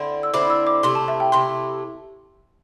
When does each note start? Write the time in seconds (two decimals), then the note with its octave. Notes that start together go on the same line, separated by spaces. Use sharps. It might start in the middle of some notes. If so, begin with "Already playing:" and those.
Already playing: D3 C4 E4
0.23 E6
0.34 D3 C4 E4 D6
0.50 E6
0.67 D6
0.83 C3 A3 E4 C6
0.95 A5
1.08 E5
1.20 G5
1.32 C3 A3 E4 C6